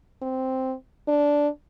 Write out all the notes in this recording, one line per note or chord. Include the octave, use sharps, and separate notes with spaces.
C4
D4